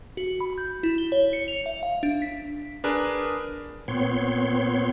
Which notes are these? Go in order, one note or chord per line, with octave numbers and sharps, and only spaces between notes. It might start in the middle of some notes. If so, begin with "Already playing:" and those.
F#4
B5
G6
E4
G7
C#5
C#7
F7
E5
F5
D4
B6
D4 G#4 A#4 B4
A#2 B3 C4 C#5 C6